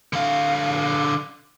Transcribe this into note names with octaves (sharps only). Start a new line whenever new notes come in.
D3 F5